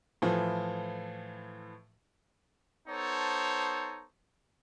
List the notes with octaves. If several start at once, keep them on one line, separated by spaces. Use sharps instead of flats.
A2 E3 F3
B3 D#4 A4 C5 C#5 A5